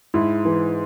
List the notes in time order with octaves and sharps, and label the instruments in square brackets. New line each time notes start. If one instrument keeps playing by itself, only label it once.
[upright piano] G#2 [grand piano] E4
[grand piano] E3